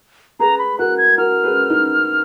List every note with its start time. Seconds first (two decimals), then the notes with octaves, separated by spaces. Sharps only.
0.40 G#4 B4 A#5
0.59 B5
0.78 F#4 A#4 F#6
0.98 G#6
1.18 F#4 A#4 F6
1.44 G#4 B4
1.70 D#4